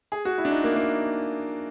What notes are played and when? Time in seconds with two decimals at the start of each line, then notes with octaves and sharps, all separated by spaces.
0.12 G#4
0.25 F#4
0.38 E4
0.45 D4
0.51 D#4
0.64 A#3
0.76 A#3